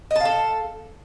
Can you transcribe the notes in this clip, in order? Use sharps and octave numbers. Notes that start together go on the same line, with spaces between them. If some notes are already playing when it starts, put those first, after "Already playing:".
A4 D#5 F5 A5